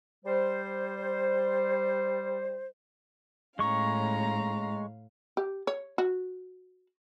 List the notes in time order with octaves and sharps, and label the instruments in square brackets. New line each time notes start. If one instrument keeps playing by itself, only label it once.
[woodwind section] G3 C5
[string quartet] A2 F5 [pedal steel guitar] G#3 C#6 [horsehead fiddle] C#4 A#5
[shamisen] G4
C#5
F#4